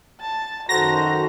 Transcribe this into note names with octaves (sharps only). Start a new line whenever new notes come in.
A5
F#2 D#3 F#4 A4 C5 A#5 A#6